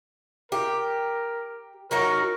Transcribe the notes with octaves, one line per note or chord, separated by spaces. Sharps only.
G4 A#4
F#3 D#4 F#4 A#4